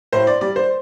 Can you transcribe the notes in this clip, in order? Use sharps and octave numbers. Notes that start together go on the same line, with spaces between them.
A2 C5
D5
G3 D5
C5